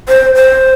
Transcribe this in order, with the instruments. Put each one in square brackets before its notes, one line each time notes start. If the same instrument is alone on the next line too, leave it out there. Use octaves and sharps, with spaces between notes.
[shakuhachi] C5
C5